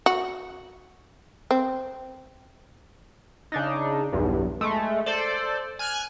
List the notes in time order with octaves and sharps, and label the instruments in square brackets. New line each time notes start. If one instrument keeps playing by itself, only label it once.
[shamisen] F#4
C4
[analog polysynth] C#3 D4 D#4
B1 E2 G2
G#3 A3
A4 C5 D5
G#5 F6 F#6 G#6